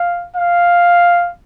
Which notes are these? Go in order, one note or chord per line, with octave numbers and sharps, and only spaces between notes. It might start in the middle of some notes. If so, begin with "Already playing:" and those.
Already playing: F5
F5